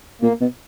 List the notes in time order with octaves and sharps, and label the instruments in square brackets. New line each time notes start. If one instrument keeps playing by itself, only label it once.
[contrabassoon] A#2 [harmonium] A#3
[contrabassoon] B2